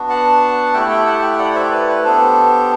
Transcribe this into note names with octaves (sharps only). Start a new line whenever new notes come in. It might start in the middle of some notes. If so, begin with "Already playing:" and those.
Already playing: B3 D4 F#4
F#5 A5
A3 E4 G4 E5 G5
E5 G5
F#5 A5
E5 G5
D5 F#5
C5 E5
B4 D5
B4
B3 D4 G4 A4 C5